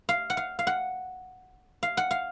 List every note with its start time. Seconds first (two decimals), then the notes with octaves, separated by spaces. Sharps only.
0.09 F5
0.30 F#5
0.37 F5
0.59 F5
0.67 F#5
1.83 F5
1.97 F#5
2.11 F5